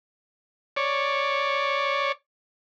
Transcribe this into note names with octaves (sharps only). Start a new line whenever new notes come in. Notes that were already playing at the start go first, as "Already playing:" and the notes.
C#5 D5